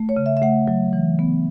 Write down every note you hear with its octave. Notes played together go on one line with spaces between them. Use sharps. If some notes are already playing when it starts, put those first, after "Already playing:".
Already playing: A3
C#5
C#3
E5
E5
A3 F#5
F#3
E3
B3